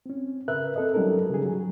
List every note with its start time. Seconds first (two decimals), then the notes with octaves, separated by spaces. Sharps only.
0.06 C4 C#4
0.48 C#3 A#4 B4 E5 F#6
0.76 C4 A4 D#5
0.94 F#3 G3 C#4 D#4 A4 A#4
1.30 C#3 G3 G#4
1.45 F#3